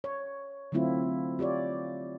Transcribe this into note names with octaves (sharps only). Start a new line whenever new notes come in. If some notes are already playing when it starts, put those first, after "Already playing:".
C#5
D3 F#3 A3 C4 E4 F4
F4 G4 C#5 D5